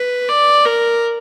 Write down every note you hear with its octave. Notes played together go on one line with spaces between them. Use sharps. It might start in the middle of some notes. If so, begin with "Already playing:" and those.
Already playing: B4
D5
A#4